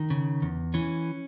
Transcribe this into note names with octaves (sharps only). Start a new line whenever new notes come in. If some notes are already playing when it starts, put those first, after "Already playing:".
Already playing: D#3
C#3
E2
E3 C#4